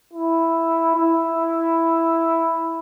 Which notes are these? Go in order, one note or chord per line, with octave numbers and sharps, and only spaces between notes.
E4
E4